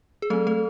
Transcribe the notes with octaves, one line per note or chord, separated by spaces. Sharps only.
G#4
F#3 A3 C4 A4
A3 A4